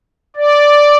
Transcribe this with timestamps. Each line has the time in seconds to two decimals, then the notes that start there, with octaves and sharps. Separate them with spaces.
0.36 D5